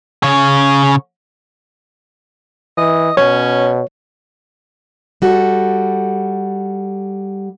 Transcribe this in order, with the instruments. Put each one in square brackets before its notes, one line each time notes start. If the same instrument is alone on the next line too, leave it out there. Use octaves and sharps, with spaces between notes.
[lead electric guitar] C#3 C#5
[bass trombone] E3 [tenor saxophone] D#5
[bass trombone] B2 [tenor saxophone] C#4 [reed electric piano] C#5
[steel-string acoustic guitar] G3 F#4 A4